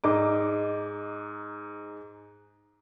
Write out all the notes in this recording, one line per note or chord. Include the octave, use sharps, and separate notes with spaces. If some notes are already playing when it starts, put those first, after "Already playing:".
G#2 D#4 D6